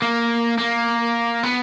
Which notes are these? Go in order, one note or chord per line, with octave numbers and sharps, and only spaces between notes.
A#3
A#3
B3